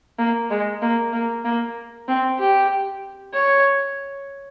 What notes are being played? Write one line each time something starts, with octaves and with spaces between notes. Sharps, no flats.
A#3
G#3
A#3
A#3
A#3
C4
G4
C#5